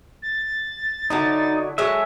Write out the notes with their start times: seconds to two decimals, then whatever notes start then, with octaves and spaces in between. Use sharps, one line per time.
0.22 A6
1.10 D3 F#3 D#4 E4
1.78 F#3 G#3 A4 E5